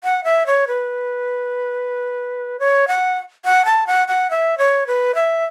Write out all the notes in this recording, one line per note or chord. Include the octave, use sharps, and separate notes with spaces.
F#5
E5
C#5
B4
C#5
F#5
F#5
A5
F#5
F#5
E5
C#5
B4
E5